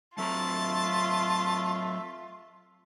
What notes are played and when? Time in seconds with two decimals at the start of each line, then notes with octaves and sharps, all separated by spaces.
0.18 F#3 A3 C4 F4 E5 A5 A#5